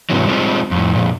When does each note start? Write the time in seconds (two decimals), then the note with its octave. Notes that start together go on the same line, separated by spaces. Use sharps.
0.10 G#2 C3 E3 F#3
0.27 G3 G#3 C4 D#4 F4
0.71 F2 A2
0.94 F2 A#2